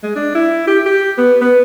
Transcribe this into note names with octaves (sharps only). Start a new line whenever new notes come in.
G#3
D4
E4
G4
G4
B3
B3